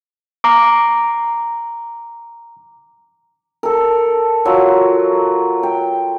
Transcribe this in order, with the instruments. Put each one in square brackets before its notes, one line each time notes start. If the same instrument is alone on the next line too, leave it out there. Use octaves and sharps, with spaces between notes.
[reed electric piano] A#5 D6
[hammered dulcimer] A4 A#4
F#3 F4
G5